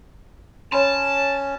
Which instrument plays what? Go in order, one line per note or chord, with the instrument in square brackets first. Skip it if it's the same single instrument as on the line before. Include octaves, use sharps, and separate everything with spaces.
[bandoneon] C#4 [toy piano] C#5 B5 C6 [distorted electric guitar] A5